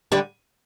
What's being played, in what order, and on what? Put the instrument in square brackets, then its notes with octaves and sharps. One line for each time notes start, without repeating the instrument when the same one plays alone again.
[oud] D3 G3